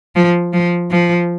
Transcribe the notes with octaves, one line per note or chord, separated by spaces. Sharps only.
F3
F3
F3